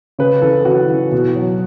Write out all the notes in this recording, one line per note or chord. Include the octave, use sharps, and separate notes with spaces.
C#3 B4
E3 A4
C#3 F#4
E3
B2
F#3